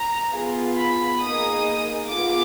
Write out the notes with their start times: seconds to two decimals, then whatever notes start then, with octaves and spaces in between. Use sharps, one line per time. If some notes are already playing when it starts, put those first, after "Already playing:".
Already playing: A#5
0.33 B3 F4 G#4
0.76 B5
1.20 A#3 D#4 G#4 D#6
2.08 B3 F4 G#4 D6